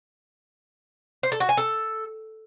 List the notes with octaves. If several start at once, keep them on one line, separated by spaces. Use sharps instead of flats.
C5
A4
F#4
G#5
A4